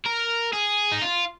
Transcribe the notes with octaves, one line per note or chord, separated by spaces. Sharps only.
A#4
G#4
D#4
F4